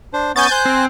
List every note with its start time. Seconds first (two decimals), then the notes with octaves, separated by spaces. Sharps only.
0.13 D4 C5
0.36 B3 C#4 G#5 G6 A6
0.51 C5 G#5 F#6 G6
0.65 C4